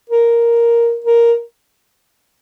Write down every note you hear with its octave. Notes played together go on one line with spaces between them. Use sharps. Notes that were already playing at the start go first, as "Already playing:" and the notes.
A#4
A#4